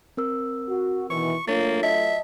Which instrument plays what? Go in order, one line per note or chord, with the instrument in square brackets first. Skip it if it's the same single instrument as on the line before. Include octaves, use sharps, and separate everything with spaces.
[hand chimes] C4 A#4 E6
[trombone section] F#4
[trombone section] B2 D#3 E3 [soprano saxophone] C#6
[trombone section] F#3 A3 F4 [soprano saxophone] A#3 [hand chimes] D4 C#5 A6
[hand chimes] D#5 A5 [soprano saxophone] E5